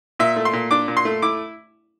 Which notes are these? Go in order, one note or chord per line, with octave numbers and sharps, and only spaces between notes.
A#2 E5
A3
C6
A#2
D4 D6
A#2
C6
A3
E4 D6